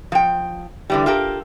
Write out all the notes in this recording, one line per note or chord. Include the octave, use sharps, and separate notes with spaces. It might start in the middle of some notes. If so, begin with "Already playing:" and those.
F3 G5
D3 E3 G3
F4 G4 A4 A#4